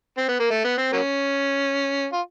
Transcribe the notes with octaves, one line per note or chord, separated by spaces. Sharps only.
C4
B3
A#3
A3
B3
C4
F#3 A#3 C#4
F4